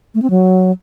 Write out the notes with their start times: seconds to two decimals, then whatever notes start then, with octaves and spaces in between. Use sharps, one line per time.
0.15 A3
0.22 C4
0.30 F#3